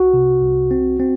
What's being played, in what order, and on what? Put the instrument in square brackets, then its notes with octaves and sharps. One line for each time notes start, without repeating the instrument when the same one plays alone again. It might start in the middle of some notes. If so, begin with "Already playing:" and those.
Already playing: [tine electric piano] C2 F#4
C3
C2
C4
C4